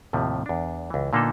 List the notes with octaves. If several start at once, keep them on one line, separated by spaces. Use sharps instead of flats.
D#2 A2 C3 F3
E2 D4
C#2 E3
A#2 D3 A#3 B3 D#4 A4